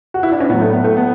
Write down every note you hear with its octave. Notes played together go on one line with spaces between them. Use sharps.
F#4
E4
D4
C#4
A2 F#3 B3
A3
B3
A3
B3